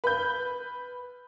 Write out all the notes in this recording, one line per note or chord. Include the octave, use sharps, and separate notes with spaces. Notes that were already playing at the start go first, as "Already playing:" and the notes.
B4 G6